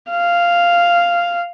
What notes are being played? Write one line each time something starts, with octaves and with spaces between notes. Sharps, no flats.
F5